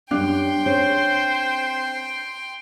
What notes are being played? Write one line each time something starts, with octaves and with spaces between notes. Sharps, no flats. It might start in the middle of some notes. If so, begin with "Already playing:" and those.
F#2 G3 D4 F5 G5 C6
C4 C#4 G#4 C5